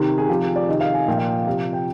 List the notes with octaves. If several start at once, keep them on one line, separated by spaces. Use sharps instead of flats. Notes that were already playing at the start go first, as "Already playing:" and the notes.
Already playing: C3 D#3
G#4
C3 F3 G4
G#4
D5
C3 D#3 D#5
F5
G#5
A#2 F3 G5
F5
G5
C3 F3 F5
G5